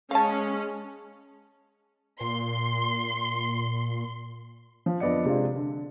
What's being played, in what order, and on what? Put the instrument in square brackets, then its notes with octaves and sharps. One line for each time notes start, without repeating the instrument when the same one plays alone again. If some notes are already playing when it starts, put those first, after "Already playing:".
[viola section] G#3 C#4 [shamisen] F5 A5
[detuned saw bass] A#2 [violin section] C6
[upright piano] F3
F2 D3 B3 D5 D#5 C#7
C3 G#3 C4 D4 F4
D3